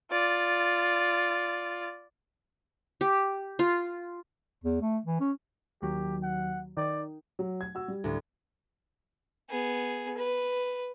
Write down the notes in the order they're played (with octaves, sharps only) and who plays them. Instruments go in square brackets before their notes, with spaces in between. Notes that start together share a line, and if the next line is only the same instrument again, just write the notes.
[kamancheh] F4 D5
[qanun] G4
F4
[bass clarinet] E2
A3
E3
C#4
[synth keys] D#2 F#3 [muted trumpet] G4
[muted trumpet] F#5
[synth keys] D#3 [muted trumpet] D5
[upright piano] F#3
G#6
F#4 E6
G3
[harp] D2 A2
[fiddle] B3 G#4
B4